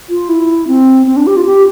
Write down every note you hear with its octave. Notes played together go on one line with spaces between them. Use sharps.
F4
E4
C4
C4
D4
G4
F4
G4